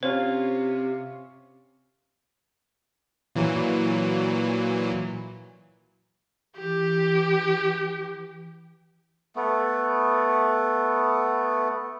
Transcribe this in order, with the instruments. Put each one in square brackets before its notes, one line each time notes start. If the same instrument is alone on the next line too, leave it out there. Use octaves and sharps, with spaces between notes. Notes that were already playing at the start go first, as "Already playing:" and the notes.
[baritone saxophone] C3 [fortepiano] C#4 F4 [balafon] C5
[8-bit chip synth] A#2 E3 F#3
[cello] E3 [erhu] G4
[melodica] A3 B3